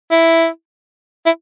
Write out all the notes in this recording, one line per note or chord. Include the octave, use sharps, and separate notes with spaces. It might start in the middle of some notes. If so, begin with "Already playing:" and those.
E4
E4